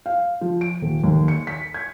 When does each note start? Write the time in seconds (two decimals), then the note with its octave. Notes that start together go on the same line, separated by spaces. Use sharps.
0.06 F5
0.41 F3
0.61 D7
0.82 D#1
1.04 D#2
1.28 C#7
1.47 B6
1.74 G#6